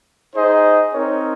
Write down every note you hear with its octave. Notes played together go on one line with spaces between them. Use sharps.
D#4 G#4 C5 D#5
C4 D#4 A#4 C#5